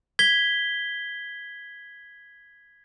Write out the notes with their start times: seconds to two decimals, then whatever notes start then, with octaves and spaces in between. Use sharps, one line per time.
0.19 G#6 B6 G7